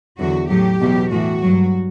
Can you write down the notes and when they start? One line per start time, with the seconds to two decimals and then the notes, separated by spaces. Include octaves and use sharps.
0.18 E2 D3 F#3 F#4
0.49 A2 F#3 G4
0.80 E2 B2 F#3
1.10 A2 E3 F#4
1.42 G2 F#3